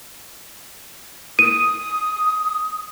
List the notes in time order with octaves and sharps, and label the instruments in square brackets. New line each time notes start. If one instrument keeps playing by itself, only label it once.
[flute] D#6 [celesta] D#7